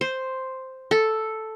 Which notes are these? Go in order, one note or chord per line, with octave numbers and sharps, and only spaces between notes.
C5
A4